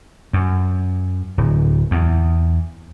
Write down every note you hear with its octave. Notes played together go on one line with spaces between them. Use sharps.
F#2
D1
E2